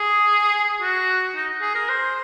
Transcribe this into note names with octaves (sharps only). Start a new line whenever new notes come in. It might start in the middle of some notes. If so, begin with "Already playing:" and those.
Already playing: G#4
F#4
D#4
G#4
A#4
C5